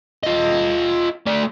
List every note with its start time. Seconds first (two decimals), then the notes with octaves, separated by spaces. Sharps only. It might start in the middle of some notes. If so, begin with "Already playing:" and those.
0.23 F4 D#5
1.26 A3 D5